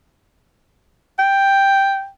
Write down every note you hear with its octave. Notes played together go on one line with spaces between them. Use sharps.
G5